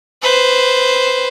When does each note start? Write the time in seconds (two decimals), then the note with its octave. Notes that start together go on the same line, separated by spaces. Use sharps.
0.22 B4 C5